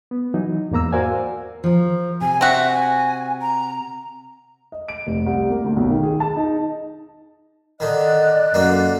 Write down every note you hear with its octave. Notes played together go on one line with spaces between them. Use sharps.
B3
E3 F#3 D#4
E2 G#2 A#3 A#5 E6
F#4 A#4 C5 D5 F5 G#5
F3 A#4
C3 G#5
C4 F#4 E5
G#5
A#5
D#5
D7
F1
C2
A#3
D2
B1
D#3
G#4
A5
D#4
D3 D#3 D5 D#5 F#6
F#2 D3 A#3 D4